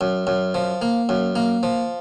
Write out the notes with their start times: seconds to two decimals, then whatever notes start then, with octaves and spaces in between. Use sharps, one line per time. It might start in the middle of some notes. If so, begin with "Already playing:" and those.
0.01 F#2
0.27 F#2
0.54 F3
0.82 A#3
1.09 F#2
1.36 A#3
1.63 F3